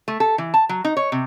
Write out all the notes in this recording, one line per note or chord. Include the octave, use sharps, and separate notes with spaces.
A3
A4
E3
A5
F#3
D#4
C#5
C3